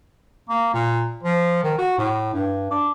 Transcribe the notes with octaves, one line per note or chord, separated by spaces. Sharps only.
A#3
A#2
F3
D#3
F#4
A2
G2
D4